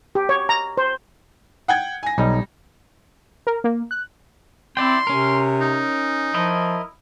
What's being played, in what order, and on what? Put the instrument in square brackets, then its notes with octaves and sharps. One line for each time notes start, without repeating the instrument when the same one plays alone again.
[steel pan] G4
C#5
A#5
C5
[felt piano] F#5 G5 G#6
G#5 A#6
[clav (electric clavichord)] B1 D#4 [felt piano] G3
[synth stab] A#4
A#3
F#6
[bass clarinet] C4 [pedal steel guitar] E4 D5 G5 [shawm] C6
[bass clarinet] C3 [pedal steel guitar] C#4 A#4
[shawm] D#4
[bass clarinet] F3 [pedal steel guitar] E4 A#4 D#5